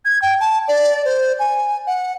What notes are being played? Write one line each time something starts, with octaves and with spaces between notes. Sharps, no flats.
G#6
G5
A5
D5
C5
G#5
F#5